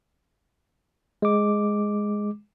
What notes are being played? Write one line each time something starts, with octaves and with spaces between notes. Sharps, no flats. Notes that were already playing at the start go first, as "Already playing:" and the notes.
G#3 D6